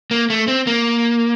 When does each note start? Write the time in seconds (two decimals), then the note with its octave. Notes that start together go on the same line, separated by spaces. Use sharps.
0.11 A#3
0.30 A3
0.48 C4
0.67 A#3